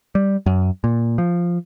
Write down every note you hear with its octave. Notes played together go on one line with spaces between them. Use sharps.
G3
F#2
A#2
F3